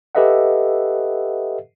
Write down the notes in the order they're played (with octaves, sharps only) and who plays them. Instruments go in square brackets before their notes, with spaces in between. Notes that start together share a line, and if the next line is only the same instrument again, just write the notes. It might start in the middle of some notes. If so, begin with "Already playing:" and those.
[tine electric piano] G4 A4 B4 D#5 E5 F#5